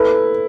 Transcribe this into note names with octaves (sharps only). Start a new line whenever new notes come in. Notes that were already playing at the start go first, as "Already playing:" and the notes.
Already playing: E4 A4 B4